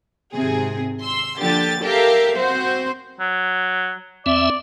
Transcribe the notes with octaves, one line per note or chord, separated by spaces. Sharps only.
G#1 C3 G#4
C6 E6
D3 F3 A#3 G4 A6
G4 A4 A#4 E5 F5
C4 F#4 C5
F#3
E2 C4 D5 E5